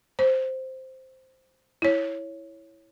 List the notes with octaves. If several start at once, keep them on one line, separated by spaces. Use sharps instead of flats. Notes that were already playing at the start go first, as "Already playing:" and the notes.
C5
E4 C#5